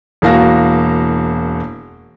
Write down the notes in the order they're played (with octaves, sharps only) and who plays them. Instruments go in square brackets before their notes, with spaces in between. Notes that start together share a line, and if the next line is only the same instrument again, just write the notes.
[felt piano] E1 E3 A#3 F#4 F5 A#6